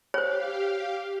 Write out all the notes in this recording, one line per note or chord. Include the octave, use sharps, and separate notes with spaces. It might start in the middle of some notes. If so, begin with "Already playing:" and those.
G4 C5 C#5 F5